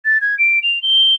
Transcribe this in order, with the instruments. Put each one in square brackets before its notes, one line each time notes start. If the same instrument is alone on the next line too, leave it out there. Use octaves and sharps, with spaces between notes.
[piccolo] A6
G#6
D7
F7
G7